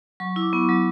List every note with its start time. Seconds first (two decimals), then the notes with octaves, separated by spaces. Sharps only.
0.20 F#3 C#6
0.36 E4
0.41 D6
0.53 B3 C#6
0.69 F#3